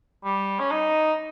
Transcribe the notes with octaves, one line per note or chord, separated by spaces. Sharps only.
G3
C#4
D#4